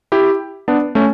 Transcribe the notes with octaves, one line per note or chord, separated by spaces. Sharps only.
E4 G4
B3 D4
A3 C#4